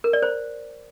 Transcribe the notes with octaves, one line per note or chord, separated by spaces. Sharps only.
A#4
D5
C5